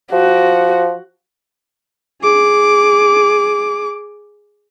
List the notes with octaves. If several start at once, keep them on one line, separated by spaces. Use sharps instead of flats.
F3 F#4
G#4 D6